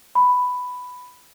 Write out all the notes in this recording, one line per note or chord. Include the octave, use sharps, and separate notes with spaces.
B5